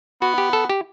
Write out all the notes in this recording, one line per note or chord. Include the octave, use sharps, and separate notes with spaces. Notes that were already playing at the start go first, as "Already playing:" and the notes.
B3 F#4
G4
A4
G4